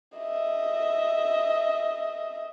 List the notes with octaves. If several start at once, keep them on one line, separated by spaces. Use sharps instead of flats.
D#5 E5